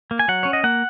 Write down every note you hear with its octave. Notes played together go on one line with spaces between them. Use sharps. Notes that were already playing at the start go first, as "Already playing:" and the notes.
A#3
G#5
F#3 F#5
C#4 C#5
D#5
A#3 F#5